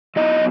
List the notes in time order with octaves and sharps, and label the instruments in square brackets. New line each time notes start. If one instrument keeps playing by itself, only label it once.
[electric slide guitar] F#3 B3 D#4 E4 D#5